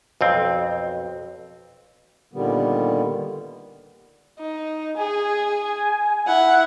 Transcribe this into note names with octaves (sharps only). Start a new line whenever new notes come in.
B1 F2 C4
A#2 D3 D#3 G3 B3
D#4
G#4 G#5
E4 F#5